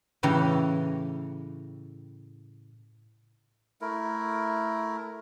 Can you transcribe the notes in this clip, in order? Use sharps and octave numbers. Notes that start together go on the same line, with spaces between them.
A2 C#3 E3 G4 C#5 A#5
A3 E4 A#4